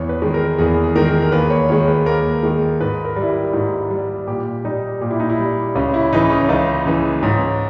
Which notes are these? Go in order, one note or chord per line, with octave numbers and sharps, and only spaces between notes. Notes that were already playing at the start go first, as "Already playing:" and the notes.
Already playing: E2 C#5
B4
D#3 G#3
A#4
E2 G#4
G#4
D#3 G#3 A#4
A#4
D#2 B4
C#5
D#3 G#3 C#5
B4
D#2 A#4
D#3 G#3
G#2 B4
A#4
G3
E4
G4
G#2 E4
G3
A#2 G4
G3 D#4
A#2 G4
E4
D#4
E4
G3
C#2 C#4
E4
C#3 E3 D#4
C#4
C#2 D#4
C#3 E3
G#2 C#4